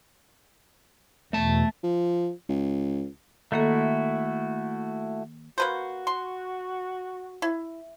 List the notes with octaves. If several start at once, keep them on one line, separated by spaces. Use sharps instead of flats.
E2 B2 A3 A5
F3
C#2
D#3 A3 A#3 E4 F#4 A4
A#3 F#4 B4 C5
C6
E4